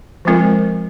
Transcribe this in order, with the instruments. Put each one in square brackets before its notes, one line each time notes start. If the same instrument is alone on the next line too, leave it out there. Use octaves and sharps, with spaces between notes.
[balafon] F3 G#3 C4 F4 A#4